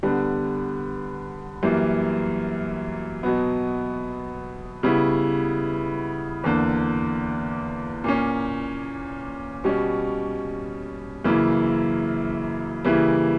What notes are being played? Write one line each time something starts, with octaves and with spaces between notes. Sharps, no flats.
D3 G3 B3
F#2 E3 G3 A#3
B2 F#3 B3
C#3 G3 B3 E4
E2 D3 A#3
A#2 A#3 C#4
B2 G3 C#4
F#2 C#3 E3 A#3 E4
C#3 E3 G3 A#3 E4